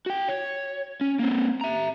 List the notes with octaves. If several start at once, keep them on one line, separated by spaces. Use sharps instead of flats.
F#4 G5
C#5
C#4
A#3 C4
E5 A#5